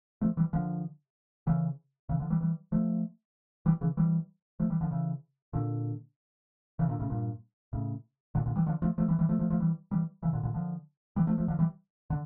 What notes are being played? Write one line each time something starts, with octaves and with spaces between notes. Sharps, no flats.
F3 A3
E3 G3
D3 F3
C#3 E3
C#3 E3
D3 F3
E3 G3
E3 G3
F3 A3
E3 G3
C#3 E3
E3 G3
F3 A3
E3 G3
D3 F3
C#3 E3
A#2 D3
C#3 E3
A#2 D3
A2 C#3
G2 A#2
A2 C#3
A#2 D3
A#2 D3
E3 G3
D3 F3
F3 A3
F3 A3
E3 G3
E3 G3
F3 A3
F3 A3
F3 A3
E3 G3
E3 G3
C#3 E3
A#2 D3
A#2 D3
D3 F3
E3 G3
F3 A3
F3 A3
D3 F3
E3 G3
D3